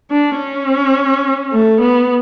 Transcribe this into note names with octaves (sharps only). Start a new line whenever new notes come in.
D4
C#4
A3
B3